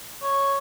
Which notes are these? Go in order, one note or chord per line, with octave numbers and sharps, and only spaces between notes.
C#5